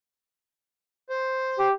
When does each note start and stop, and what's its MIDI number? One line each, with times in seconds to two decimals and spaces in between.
1.10 1.68 72
1.59 1.72 67